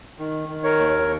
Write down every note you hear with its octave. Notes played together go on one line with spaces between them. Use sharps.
D#3
D#3
A#4 C#5
D#2